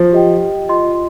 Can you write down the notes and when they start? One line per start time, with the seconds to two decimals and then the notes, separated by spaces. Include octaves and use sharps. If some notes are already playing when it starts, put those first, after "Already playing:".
Already playing: F3
0.12 G4 D#5 G5
0.69 F4 D#5 C6